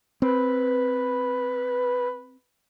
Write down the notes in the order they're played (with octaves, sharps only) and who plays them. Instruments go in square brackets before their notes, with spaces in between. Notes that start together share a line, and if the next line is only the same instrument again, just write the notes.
[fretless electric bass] C4 [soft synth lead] B4